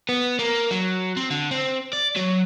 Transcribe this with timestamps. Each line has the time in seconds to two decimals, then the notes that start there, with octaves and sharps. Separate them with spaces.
0.09 B3
0.39 A#3
0.71 F#3
1.17 C4
1.30 D3
1.51 C4
1.93 D5
2.16 F#3